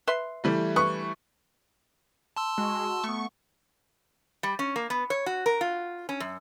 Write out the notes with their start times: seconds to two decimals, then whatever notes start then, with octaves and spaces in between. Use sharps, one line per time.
0.07 B4 E5 C6
0.44 E3 G3 A3
0.76 B4 C#6
2.36 A5 C6 E6
2.58 G#3 F#4
3.04 A3 B3 C#6
4.43 G3
4.59 C#4
4.76 A#3
4.90 B3
5.10 C#5
5.26 F#4
5.46 A#4
5.61 F4
6.09 C#4
6.20 F#2